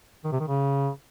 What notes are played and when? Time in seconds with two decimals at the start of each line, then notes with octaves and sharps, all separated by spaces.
0.24 D#3
0.32 C3
0.40 D#3
0.48 C#3